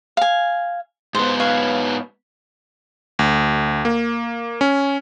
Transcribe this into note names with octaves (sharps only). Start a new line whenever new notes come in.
F5 G#5
G#2 B3 C5
B4 C#5 F5
D2
A#3
C#4